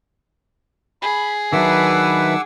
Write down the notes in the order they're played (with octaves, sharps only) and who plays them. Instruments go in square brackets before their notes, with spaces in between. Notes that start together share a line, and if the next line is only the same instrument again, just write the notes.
[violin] G#4 [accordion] B5
[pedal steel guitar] D#3 F#3 D4 [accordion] B4 E5 [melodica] F#5 D6 E6